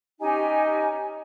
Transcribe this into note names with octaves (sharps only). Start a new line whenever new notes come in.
C#4 D#4 G4 G#5